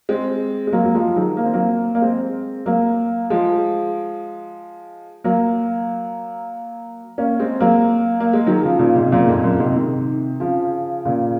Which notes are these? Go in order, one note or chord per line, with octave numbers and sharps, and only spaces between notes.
G#3 C4
G#3
F#3 A#3
F#3
F3 G#3
D#3 F#3
A#3
C4
F#3 A#3
A#3
G#3 C4
F#3 A#3
F3 G#3
F#3 A#3
A#3 C#4
G#3 C4
F#3 A#3
A#3
G#3
D#3 F#3
C#3 F3
A#2 C#3
G#2 C3
F#2 A#2
F2 G#2
F#2 A#2
G#2 C3
C3 D#3
C#3 F3
A#2 C#3